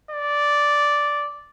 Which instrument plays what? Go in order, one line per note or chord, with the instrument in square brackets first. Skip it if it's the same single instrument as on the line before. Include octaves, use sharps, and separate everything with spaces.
[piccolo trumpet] D5